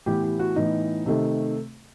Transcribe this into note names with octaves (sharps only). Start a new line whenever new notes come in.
A2 E3 B3 G4
G4
F#4
A2 E3 B3 D#4
C3 D#3 A3